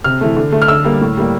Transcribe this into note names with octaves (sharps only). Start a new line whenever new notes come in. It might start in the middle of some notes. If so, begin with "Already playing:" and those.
C3 F6
E3 A3
D3
A3
F6
D3 E6
G3 A#3
A2
G3 A#3